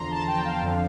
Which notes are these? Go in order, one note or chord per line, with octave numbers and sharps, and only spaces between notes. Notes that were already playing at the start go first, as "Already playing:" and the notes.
Already playing: E2 D3 F3 A#5 C6
A5
G5
F5
F2 D3 F3